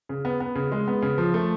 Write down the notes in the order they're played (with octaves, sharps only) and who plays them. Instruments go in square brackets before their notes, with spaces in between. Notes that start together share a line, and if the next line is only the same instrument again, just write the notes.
[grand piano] C#3
B3
B3
C#3
G#3
B3
C#3
F3
A3